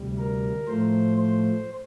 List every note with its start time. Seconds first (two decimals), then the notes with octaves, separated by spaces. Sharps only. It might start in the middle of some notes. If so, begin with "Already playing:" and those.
Already playing: D2 C3 G3
0.19 A#4
0.68 A2 F3 A3 C5
1.18 C5